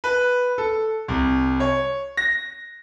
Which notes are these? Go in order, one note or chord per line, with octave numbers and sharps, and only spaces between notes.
B4
A4
C2
C#5
A#6